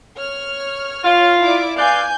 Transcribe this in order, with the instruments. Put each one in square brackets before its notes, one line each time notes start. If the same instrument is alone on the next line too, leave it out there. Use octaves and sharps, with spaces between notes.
[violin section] C#5 F6
[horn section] F4
[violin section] E4 D5 D6
[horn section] B4 D5 F5 [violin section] G#5 G6